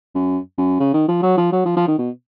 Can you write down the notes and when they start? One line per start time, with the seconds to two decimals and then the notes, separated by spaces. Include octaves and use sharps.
0.15 F#2
0.58 F#2
0.80 C#3
0.93 D#3
1.08 F3
1.22 F#3
1.37 F3
1.52 F#3
1.65 F3
1.76 F3
1.87 D#3
1.98 B2